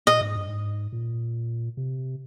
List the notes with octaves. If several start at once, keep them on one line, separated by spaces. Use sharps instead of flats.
A#2 D#5
G#2
G2
G#2
A#2
C3